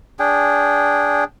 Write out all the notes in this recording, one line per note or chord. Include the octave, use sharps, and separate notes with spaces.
D4 G#4 G5